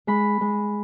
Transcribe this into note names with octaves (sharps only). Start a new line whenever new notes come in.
G#3 B5
G#3